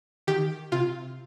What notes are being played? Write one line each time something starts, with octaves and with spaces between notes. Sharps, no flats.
D#3 G4
C3 F4